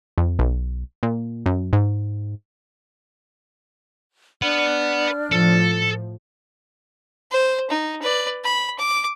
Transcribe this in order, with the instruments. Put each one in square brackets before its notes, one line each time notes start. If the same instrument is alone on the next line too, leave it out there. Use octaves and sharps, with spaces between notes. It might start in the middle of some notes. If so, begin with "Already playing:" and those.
[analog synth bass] F2
B1
A#2
F#2
G#2
[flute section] D4 D5 F6 [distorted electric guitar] B4 F#5
[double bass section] A2 F3 [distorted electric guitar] A4
[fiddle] C5
D#4
B4 D5
B5
D6